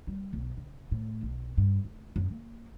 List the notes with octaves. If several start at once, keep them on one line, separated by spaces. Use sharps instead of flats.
G3
B1
C#3
A2
B1
G2
F1
F#2
A#3